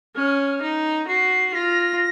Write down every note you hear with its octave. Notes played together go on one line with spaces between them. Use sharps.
C#4 F6
D#4
F#4 C7
F4 A#6